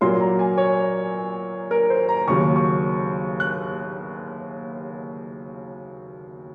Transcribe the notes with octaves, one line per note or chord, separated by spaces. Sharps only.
A#2 F#3 A#3 C6
A#5
G#5
C#5
A#4
C5
A#5
D#2 C#3 F#3 C#6
C#6
F#6